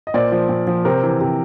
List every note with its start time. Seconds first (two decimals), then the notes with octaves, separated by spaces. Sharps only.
0.07 D#5
0.14 A#2 C5 D5
0.32 F3
0.49 A#2
0.67 F3
0.85 C3 A#4 C5
1.03 E3
1.21 C3